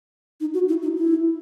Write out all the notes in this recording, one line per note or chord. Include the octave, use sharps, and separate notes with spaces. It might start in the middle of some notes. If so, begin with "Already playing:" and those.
D#4
F#4
E4
D#4
E4